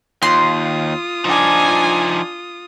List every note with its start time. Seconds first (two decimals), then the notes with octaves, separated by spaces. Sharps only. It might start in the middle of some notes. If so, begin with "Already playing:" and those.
0.22 D#2 F4 C6 D#6
1.25 F3 D4 D#4 G#5